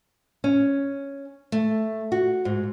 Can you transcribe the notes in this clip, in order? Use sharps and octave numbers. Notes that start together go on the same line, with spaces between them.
C#4
A3
F#4
G#2